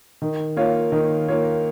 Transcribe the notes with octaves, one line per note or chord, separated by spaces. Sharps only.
D#3
A#3 F4 C#5
D#3
A#3 F4 C#5